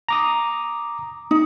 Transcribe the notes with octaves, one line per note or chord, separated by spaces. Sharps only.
A#5 D6 D#6
D#4